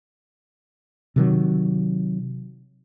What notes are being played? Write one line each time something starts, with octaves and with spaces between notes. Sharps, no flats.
C3 D#3 F#3